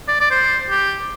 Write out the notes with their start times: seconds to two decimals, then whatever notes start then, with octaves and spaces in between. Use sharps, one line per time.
0.08 D5
0.21 D5
0.31 C5
0.70 G4